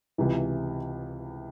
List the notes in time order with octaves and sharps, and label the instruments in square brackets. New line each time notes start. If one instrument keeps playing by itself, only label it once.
[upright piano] C#2 C3 E3